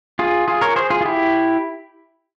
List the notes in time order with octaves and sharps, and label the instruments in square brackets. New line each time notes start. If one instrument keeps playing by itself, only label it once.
[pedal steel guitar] F4 G#4
F4 G#4
A#4 C#5
G#4 C5
F4 G#4
F4
E4 G4